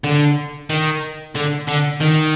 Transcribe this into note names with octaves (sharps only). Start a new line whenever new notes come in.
D3
D#3
D3
D3
D#3